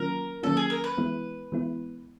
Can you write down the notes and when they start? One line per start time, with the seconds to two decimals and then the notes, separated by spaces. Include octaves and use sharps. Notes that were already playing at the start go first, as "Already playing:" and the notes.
Already playing: D#3 F#3 A#3 C#4 F4 A#4
0.43 D#3 F#3 A#3 C#4 F4 A4
0.57 G#4
0.70 A#4
0.84 B4
0.98 E3 G#3 B3 E4
1.52 E3 G#3 B3 E4